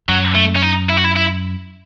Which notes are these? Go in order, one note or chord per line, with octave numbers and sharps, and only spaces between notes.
F#2 F#3
A3
C#4
D#4
E4
F#4
E4
E4